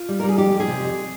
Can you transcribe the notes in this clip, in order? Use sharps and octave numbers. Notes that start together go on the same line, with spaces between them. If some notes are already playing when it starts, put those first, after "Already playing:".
Already playing: F4
G3
A#4
G3
G#4
F2 G4
F2
G#4
C3
F2